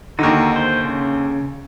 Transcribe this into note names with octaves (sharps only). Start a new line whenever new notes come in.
D#2 D3 D#4 F#4
C5
C#3